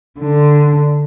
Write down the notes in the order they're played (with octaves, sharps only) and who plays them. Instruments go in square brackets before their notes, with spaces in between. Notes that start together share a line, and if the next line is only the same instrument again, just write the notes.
[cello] D3